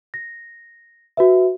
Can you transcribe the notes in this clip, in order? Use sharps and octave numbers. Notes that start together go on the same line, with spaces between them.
A#6
F#4 B4 E5